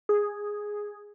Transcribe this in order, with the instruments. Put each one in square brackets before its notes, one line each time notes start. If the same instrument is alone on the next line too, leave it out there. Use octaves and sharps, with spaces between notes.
[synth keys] G#4